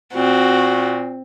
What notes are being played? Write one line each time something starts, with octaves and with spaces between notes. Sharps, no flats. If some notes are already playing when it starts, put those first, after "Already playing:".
A#2 C4 F#4